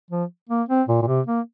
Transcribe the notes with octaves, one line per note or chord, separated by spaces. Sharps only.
F3
A#3
C4
A#2
A#2
C3
A#3